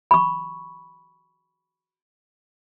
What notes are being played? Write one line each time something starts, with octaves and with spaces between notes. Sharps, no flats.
B5 C#6